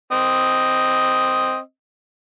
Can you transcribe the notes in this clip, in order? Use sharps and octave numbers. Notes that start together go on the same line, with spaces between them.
C4 D#5